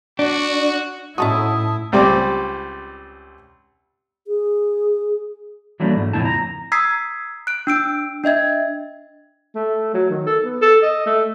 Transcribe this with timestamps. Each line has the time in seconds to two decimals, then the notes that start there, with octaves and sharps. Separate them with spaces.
0.19 D4 F#4
1.18 A2 C#4 D#4 E4 F#4 A5 D#6
1.92 C#2 G3 C4 D5
4.27 G#4
5.80 E3 F#3 G3 A3 A#3 D4
5.96 G#2 A3
6.13 F2 A2 C#3 C4 E4 A5
6.25 A#5
6.72 A#5 D#6 E6 G#6 B6 C7
7.47 F#6 D7
7.67 D4 E6 D7
8.24 D4 D#5 E5 G#6
9.55 A3
9.94 F#3
10.10 D#3
10.27 A4
10.45 B3
10.62 A4
10.83 D#5
11.06 A3